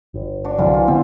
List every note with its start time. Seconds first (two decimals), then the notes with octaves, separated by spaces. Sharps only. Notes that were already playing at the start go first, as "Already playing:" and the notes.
0.14 G1
0.45 D4 F#4
0.58 C2 D3 E3 F#3 C4 F4
0.74 F4
0.88 D3 B3 C4